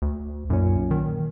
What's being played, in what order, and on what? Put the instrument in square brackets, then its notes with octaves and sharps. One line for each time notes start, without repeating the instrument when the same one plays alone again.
[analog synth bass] D2
[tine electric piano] B1 A#2 C#4 [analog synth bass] F#2
[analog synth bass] D#3